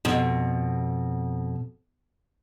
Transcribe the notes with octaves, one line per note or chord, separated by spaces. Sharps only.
F2 B2